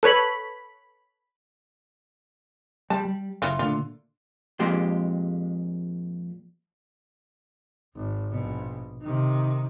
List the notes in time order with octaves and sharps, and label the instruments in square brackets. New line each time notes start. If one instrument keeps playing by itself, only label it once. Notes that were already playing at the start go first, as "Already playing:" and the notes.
[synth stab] A4 B4 C#5 B5
[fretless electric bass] G3 [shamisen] A5
[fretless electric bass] G3
[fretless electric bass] F#1 [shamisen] E3 F4
[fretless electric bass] A#2 D3 A3 [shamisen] F4
[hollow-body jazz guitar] F2 A#2 G#3 G4 C6
[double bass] G#1
A#1 B2
C3 D#3